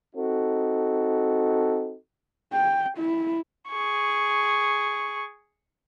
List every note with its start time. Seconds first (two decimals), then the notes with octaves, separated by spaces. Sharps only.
0.16 C4 D#4 F#4 A4
2.53 G5
2.98 E4
3.70 G#4 C#6